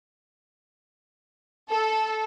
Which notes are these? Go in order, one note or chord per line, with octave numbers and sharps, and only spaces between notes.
A4